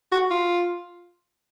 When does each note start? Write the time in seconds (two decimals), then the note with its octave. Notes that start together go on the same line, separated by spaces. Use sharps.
0.12 F#4
0.30 F4